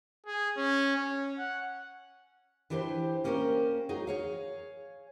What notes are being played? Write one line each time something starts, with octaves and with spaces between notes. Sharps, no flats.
G#4
C#4
C#4
F#5
E3 D4 G4 A4 B4 C5
A#3 C#4 G4 A4 A#4 C5
F#3 D#4 G#4
G#4 C#5 F5